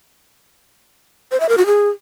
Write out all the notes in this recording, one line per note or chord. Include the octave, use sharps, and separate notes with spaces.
C5
E5
A#4
F#4
G#4